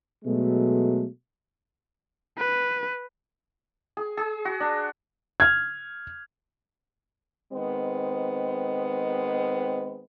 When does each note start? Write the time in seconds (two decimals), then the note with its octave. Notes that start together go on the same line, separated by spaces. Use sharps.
0.24 B2 F#3 G#3 A3
2.38 B4
3.97 G#4
4.17 G#4
4.45 F#4
4.60 D4
5.40 F6 G#6
7.53 D#3 G#3 B3 C4